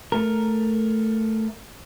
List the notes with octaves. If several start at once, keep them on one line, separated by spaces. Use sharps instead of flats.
A3 A#4